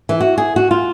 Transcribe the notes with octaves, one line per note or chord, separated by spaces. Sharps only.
E3
F#4
G#4
F#4
F4